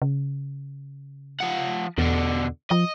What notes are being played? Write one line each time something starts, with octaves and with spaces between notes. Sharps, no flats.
C#3
F3 F#5
E2 B2 D3
F3 D#5